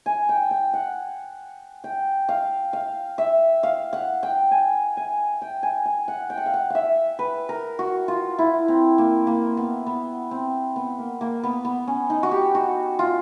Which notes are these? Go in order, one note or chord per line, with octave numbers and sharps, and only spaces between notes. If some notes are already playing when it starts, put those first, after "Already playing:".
G#5
G5
G5
F#5
G5
F5
F5
E5
F5
F#5
G5
G#5
G#5
G5
G#5
G#5
F#5
G5
F#5
F5
F#5
E5 F5
B4
A#4
F#4
F4
E4
C4
A#3
A#3
B3
B3
C4
B3
A#3
A#3
B3
B3
C#4
D#4
F#4
G4
F#4
F4